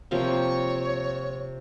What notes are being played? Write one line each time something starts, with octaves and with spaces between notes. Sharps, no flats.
C3 F3 A#3 C#5